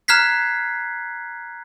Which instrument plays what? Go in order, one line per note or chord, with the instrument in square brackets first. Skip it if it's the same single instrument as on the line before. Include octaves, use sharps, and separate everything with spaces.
[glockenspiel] A#5 F6 F#6 G#6 B6 C7